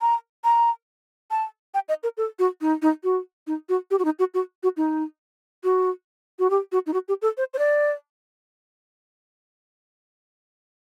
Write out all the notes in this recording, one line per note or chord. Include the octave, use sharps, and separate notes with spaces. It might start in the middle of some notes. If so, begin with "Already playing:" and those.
A#5
A#5
A5
G5
D#5
A#4
A4
F#4
D#4
D#4
F#4
D#4
F#4
G4
F#4
D#4
F#4
F#4
F#4
D#4
F#4
F#4
G4
F#4
D#4
F#4
G4
A4
C5
C5
D5